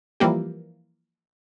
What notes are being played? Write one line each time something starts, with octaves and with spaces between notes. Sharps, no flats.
E3 F3 G3 A#3 G4